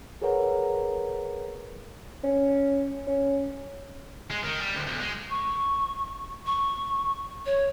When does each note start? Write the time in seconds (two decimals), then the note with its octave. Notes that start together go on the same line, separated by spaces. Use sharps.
0.22 G#4 A#4 B4 C#5 F#5 A#5
2.24 C#4
3.07 C#4
4.31 G#3
4.44 D#3
4.60 G3
4.74 D2
4.86 B1
5.01 G#3
5.30 C#6
6.46 C#6
7.46 C#5